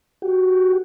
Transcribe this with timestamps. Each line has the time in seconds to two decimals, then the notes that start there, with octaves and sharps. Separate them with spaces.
0.22 F#4 G4